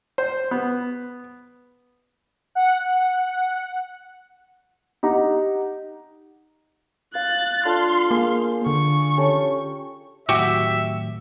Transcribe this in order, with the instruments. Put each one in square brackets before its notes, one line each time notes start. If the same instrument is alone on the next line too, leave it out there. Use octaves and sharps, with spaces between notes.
[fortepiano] C5
B3
[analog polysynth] F#5
[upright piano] D#4 G4 F#5 A#5
[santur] F5 [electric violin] F#6 A6
[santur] D4 F4 A4 [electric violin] F5 C6
[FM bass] A#3 [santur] G#4 C5
[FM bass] D3 [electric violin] C#6
[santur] C#4 G4 A4
[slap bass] A2 D#3 F#3 [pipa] F#4 G4 [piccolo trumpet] E5